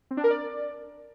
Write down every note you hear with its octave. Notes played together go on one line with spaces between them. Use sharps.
C4
D4
A#4
D5